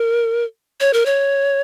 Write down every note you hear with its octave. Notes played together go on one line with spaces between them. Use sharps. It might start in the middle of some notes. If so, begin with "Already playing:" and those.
Already playing: A#4
C#5
A#4
C#5